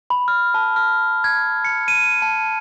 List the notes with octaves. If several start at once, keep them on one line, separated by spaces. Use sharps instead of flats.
B5
F6
A5
F6
G#6
C#7
D#7
A5